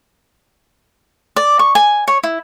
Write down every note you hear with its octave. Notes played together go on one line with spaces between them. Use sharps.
D5
C#6
G#5
C#5
E4